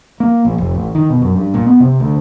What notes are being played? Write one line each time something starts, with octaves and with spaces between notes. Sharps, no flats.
A#3
A#1
F1
A1
D#3
B2
F#2
G2
A#2
B3
C3
D2